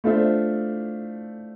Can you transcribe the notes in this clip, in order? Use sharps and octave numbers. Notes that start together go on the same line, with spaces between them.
A3 D4 F4 C5 E5